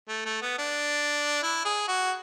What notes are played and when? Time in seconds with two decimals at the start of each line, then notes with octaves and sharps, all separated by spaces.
0.08 A3
0.25 A3
0.42 B3
0.58 D4
1.43 E4
1.65 G#4
1.88 F#4